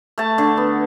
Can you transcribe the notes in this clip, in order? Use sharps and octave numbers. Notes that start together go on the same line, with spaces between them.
A3 A5
D3
B3